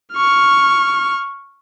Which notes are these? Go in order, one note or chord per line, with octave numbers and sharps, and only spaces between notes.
C#6 F6